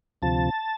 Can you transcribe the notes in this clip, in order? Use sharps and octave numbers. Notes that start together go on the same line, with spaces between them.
D2 C3 F3 A5